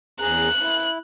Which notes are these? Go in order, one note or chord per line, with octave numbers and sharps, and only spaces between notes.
E2 G#4 A#5 F#6
E4